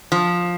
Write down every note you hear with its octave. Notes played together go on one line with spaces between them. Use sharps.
F3